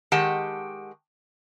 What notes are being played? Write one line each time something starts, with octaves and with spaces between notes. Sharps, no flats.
D#3 G#3 G4 F#5 A5